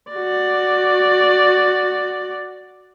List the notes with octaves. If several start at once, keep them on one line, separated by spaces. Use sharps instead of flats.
F#4 D5